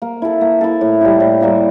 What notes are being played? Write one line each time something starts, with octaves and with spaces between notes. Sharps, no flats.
A#3
E4 A4
A#3
E4 A4
A2
G3 A#3 E4
A2
G3 A#3 E4